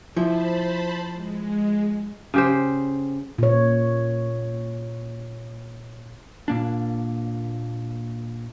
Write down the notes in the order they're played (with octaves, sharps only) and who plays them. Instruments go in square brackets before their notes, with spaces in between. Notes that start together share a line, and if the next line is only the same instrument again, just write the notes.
[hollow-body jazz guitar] F3 E4 [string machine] C5 A5 B5
[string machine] G#3
[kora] C#3 G4 C5
[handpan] A#2 C#5
[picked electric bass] A#2 A#3 D4